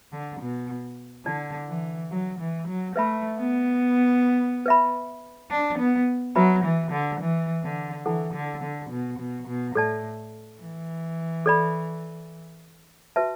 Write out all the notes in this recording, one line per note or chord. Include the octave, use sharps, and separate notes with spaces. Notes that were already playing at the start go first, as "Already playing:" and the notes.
D3
B2
D3 E4 D5 A5
E3
F#3
E3
F#3
A3 B4 E5 B5
B3
B4 E5 B5
D4
B3
F#3 D4 F#4 B4 E5 B5
E3
D3
E3
D3
E3 E4 A4 F#5 A5
D3
D3
B2
B2
B2
A2 A4 D5 A5
E3
A4 D5 B5
F#4 B4 E5 A5